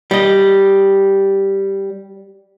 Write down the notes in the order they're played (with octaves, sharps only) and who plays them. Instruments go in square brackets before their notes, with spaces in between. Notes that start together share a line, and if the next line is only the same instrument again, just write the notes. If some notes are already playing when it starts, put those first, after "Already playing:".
[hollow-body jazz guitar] G3 D#5